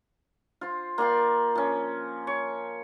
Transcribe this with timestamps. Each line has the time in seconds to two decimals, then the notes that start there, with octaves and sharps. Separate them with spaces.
0.61 F4 C5
0.98 A#3 D5 G5 C6
1.55 F3 C#4
2.27 C#5